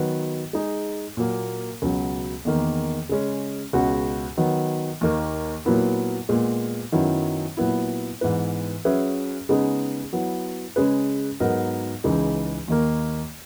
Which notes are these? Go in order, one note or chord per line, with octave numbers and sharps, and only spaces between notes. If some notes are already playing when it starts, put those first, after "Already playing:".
Already playing: D#3 F#3 B3 F#4 B4
G#3 D#4 G#4
A#2 F#3 A#3
C#2 B2 F#3
E2 D#3 A#3
C#3 G#3 C#4
C#2 B2 G#3 C#4 F#4
D#3 F#3 B3
D#2 D#3 A#3
A#2 F#3 B3 E4 A#4
A#2 G#3 B3
F#2 D#3 F#3 B3 E4
A#2 F#3 B3 E4
G#2 E3 B3 E4 B4
F#3 C#4 G#4 B4 E5
C#3 G#3 B3 D#4 G#4
F#3 B3 E4
C#3 G#3 C#4 G#4 B4
G#2 F#3 B3 D#4 A#4
C#2 C#3 E3 G#3 D#4
D#2 D#3 A#3